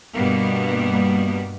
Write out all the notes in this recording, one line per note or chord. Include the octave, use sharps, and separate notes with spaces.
G2 B2 G3 A#3 B3